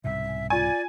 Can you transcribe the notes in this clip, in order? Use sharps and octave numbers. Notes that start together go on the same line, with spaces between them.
C2 G#2 B2 E5
G#5
F4 D5 G#5 A6 D#7